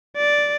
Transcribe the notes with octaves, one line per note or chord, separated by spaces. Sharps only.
D5